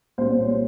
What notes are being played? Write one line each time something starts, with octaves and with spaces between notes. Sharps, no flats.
C2 A#2 G3 C#4 C5
C#5